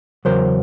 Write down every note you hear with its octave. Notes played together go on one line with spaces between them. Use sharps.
E2 C#3 F#3 A#4 C5